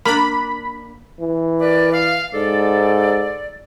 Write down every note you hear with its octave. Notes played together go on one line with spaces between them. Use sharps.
A#3 D4 B5
E3
A#4 B4 D5
F5
G#2 A4 D5